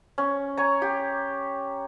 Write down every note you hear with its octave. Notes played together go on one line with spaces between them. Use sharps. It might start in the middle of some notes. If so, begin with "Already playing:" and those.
C#4
C#5 G#5 A#5
G4